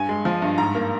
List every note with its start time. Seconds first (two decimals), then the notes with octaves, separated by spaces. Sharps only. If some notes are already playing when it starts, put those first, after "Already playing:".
Already playing: G2 G#5
0.09 G#3
0.25 F3
0.42 G2
0.58 G#2 A#5
0.75 A#3